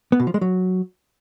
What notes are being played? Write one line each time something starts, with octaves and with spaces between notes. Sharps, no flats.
B3
B2
F3
G#3
F#3